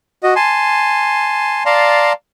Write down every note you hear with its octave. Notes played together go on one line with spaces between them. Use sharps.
F#4 D#5
G#5 A5 C6
D5 F5 A5 A#5 C6